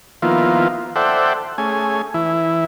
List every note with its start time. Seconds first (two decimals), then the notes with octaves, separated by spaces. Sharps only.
0.22 D#3 F3 A#3 B3 E4 F4
0.96 A4 C5 D5 E5 F#5 G5
1.58 A3 C#4 G#4 G#5
2.14 E3 E4